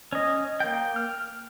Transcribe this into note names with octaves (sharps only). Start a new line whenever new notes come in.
C#4 D#5
A#3 G5
F6